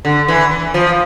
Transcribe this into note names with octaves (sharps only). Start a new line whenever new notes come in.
D3
E3
E3
F3